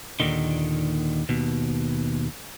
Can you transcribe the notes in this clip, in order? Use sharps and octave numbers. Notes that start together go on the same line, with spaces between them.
D#2 A#2 D3 D#3
D#2 B2